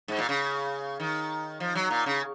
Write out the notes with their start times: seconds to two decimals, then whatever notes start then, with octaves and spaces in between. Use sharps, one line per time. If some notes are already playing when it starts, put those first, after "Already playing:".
0.08 G#2
0.18 A#2
0.29 C#3
1.00 D#3
1.60 F3
1.75 F#3
1.91 A#2
2.06 C#3